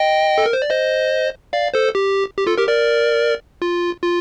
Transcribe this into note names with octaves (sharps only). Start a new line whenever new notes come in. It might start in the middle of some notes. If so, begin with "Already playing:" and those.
Already playing: D#5 G5
A4
A#4
C5
D5
C5 D#5
D5 F5
A4 C5
G4
G4
F4 A4
G4 A#4
A#4 D5
F4
F4